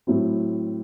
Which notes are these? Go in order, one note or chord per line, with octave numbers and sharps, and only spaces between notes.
A2 F#3 C4 E4